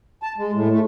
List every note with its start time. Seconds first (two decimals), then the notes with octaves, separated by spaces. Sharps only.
0.23 A5
0.38 G#3
0.53 A2
0.71 A3